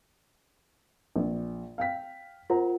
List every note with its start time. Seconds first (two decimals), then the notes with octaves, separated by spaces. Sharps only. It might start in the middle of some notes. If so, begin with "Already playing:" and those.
1.16 A#1
1.78 F5 G5 B6
2.50 F4 A#4 C5 F#5 A#5